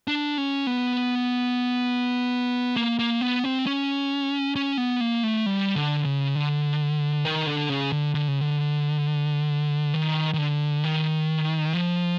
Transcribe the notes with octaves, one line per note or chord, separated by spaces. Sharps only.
D4
C#4
B3
A#3
A#3
B3
C4
C#4
C#4
B3
A#3
A3
G3
D3
C#3
D3
D#3
D3
C#3
D3
D3
C#3
D3
D#3
D#3
D3
D#3
F3